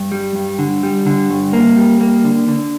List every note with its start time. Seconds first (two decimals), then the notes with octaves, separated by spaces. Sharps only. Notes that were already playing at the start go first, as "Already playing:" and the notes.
Already playing: G2
0.12 G3
0.35 G2
0.59 D3
0.83 G3
1.06 D3
1.30 G2
1.53 A#3
1.77 G3
2.01 A#3
2.24 D3
2.48 D3